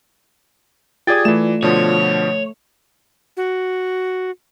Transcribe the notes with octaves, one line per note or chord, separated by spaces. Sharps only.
F4 G4 G#4 D5 G5 D#6 G#6 A6
E3 A3 E7
B2 D3 F3 C#5
F#4